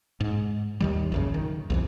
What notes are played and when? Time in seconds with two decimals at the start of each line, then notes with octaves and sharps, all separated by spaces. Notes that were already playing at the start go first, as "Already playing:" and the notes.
0.20 G#2
0.80 D#2 D#3 G3
1.12 A#1 F#2 C#3
1.34 D#3
1.70 B1 F2 E3